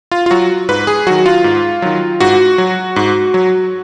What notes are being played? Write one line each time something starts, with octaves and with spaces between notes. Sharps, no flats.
F4
F4
F#3 F#4
G#2 B4
G#4
D#3 F#3 F#4
F4
G#2
D#3 F#3
G#2 F#4
F#3
G#2
F#3